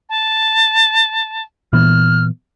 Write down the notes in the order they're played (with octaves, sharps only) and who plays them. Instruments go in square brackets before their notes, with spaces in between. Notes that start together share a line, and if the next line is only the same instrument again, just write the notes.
[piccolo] A5
[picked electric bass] A#2 E3 B3 [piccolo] F6